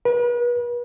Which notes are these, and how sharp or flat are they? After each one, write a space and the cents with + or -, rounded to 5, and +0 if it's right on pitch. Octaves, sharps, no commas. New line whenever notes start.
B4 -40